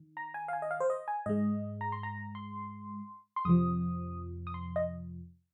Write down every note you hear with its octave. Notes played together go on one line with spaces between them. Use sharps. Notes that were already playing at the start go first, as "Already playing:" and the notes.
Already playing: D#3
A#5
G#5
F5
G#5
D#5
F5
C5
D#5
G#5
G#2 G#3 D#5
A#5
C6
A#5
C6
C6
F2 C3 F3 D#6
D#6
C6
D#5